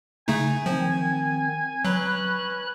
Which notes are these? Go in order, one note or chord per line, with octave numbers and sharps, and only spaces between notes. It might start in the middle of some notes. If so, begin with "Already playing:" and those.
C#3 A3 D#4 G#5
D#3 F3 C4
F#3 C#4 B4 B5 F#6